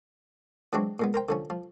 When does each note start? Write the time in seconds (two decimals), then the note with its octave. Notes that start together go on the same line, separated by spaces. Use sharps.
0.73 E3 F#3 G#3 C4 D4 F#4
1.00 A#2 G#3 B3
1.14 A#4 C5 G5
1.29 D3 F3 C#4
1.50 F3